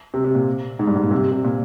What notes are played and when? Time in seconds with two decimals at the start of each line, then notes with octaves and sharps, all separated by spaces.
0.14 C3
0.24 C3
0.35 A#2
0.79 G#2
0.87 G2
0.95 G#2
1.03 A#2
1.11 C3
1.32 C3
1.44 A#2